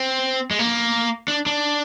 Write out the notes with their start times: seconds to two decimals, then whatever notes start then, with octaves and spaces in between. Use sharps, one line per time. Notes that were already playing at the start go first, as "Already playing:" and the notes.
Already playing: C4
0.51 G#3
0.59 A#3
1.28 D4
1.46 D4